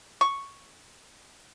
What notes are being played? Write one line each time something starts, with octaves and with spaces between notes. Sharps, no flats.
C#6